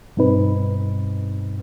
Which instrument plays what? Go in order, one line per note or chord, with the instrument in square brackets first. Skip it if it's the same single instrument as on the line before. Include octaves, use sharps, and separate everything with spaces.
[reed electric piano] G2 B2 C4 D#4 B4